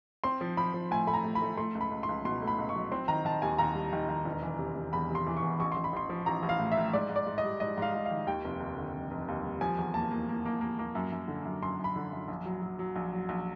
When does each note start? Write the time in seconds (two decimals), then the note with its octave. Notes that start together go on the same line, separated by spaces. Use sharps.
0.24 C4 C6
0.41 F3
0.57 F3 B5
0.74 F3
0.91 A2 G#5
1.07 A3 B5
1.13 A#5
1.24 A3
1.35 B5
1.42 A3
1.57 A3 C6
1.75 C#2
1.81 B5
1.91 C#2
2.03 C6
2.09 C#2
2.25 B2 C6
2.42 A3
2.47 B5
2.58 C#2
2.69 C#6
2.76 F#3
2.91 C4 C6
3.08 D#3 A#5
3.25 D#3 A5
3.42 D#2 G#5
3.58 D#2 A#5
3.75 G3
3.93 D#3
4.09 D#3
4.25 E1
4.43 E3
4.59 C3
4.75 C3
4.93 E2 B5
5.10 C3
5.15 C6
5.26 E3
5.37 C#6
5.43 E2
5.60 A1 C#6
5.72 A1 C6
5.84 B5
5.93 A1 C6
6.09 F3
6.26 A1 A#5
6.43 A1
6.49 F5
6.59 A2
6.72 E5
6.77 A2
6.93 G#2 D5
7.10 G#2
7.16 D5
7.27 G#2
7.38 D#5
7.44 G3
7.60 G#2 D#5
7.78 G#2 F5
7.94 G#2
8.06 F5
8.11 D#3
8.27 D#2 G5
8.44 F1
8.60 D#2
8.77 D3
8.94 F1
9.11 F1
9.28 D#2
9.44 G3
9.61 F3 G#5
9.78 E2
9.94 A#3 A5
10.11 A#3
10.29 A#3
10.45 A#3
10.61 A#3
10.79 A#3
10.95 F#2
11.12 F#2
11.28 D3
11.45 F#2
11.63 F#2 C6
11.79 F#2 B5
11.96 D3
12.13 F#2
12.28 A#1
12.46 F#3
12.62 F#3
12.79 F#3
12.96 A#1
13.13 F#3
13.29 A#1